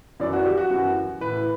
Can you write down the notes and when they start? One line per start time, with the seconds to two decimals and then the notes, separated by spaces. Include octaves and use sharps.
0.20 F#2 E3 D5
0.33 F#4
0.46 G4
0.57 F#4
0.70 F#2 E3 F#4
1.21 A2 E3 B4